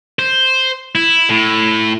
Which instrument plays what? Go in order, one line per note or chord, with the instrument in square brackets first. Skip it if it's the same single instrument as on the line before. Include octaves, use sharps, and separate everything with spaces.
[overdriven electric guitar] C5
E4
A2